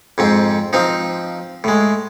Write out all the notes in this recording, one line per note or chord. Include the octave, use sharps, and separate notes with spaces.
F2 G#2 C4
F3 C4 D#4
A2 G#3